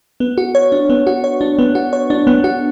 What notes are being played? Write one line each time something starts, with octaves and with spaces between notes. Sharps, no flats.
B3
F#4
C#5
D4
B3
F#4
C#5
D4
B3
F#4
C#5
D4
B3
F#4